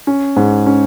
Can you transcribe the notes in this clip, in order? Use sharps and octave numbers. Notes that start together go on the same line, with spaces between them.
C#4
G#2
C#4